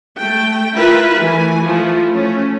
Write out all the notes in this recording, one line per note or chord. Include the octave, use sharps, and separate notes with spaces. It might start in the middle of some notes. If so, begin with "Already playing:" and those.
A3 G5
E4 F4 A#4 B4 E5
E3 A3 G#5
F3 A3 E4 F4
A3 C#4